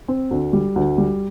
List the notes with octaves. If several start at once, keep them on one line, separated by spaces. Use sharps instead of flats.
C4
D2
G3
D2
G3